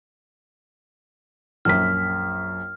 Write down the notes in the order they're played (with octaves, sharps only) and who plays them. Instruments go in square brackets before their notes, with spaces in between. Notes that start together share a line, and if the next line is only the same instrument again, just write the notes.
[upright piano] A#1 F#2 B6 [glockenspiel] F6